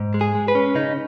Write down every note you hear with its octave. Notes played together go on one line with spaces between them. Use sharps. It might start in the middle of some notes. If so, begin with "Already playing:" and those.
Already playing: G#2
G#3
G#4
G#3
B4
C#4
C#3 D#4